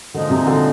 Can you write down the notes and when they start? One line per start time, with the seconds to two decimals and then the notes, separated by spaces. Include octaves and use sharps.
0.14 A#2 D3 F3 G#3 D#4
0.30 C3
0.47 D3